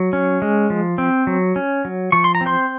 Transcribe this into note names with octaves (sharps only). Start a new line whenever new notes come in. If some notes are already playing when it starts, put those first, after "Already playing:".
Already playing: F#3
C#4
G#3
F3
C4
F#3
C#4
F#3
F3 C#6
C6
A#5
C4
C5 C6